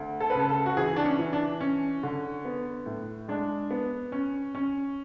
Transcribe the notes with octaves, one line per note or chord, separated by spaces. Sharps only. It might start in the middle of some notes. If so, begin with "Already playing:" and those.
Already playing: D2
A4
B4
C#3 A4
A4
F#4
E3 G#4
D4
C#4
E3
D4
C#4
D3
B3
A2
G#3 D4
B3
C#4
C#4